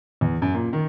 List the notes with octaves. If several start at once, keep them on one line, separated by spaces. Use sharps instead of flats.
E2
F#2
A#2
D#3